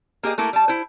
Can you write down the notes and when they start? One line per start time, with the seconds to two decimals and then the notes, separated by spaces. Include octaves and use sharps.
0.23 A#3 G4 G#4 D#5
0.38 A3 A#3 E4
0.53 G3 A5
0.68 E4 C5